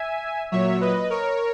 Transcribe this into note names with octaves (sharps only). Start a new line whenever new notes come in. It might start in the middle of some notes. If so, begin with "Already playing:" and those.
Already playing: E5 G#5
A#2 F#3 C#5 E5
B4 D#5
A#4 C#5